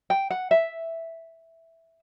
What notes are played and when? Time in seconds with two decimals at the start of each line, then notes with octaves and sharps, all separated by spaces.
0.10 G5
0.30 F#5
0.51 E5